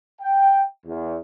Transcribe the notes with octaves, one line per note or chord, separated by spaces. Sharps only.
G5
E2